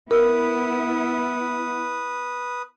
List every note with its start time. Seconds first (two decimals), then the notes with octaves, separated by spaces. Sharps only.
0.11 B3 E4 A#4 B4 D#6 E6